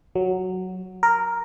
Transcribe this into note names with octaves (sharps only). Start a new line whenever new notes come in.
F#3
A#4